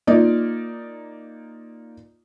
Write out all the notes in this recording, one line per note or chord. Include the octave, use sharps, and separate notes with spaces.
A#3 D#4 F4 D5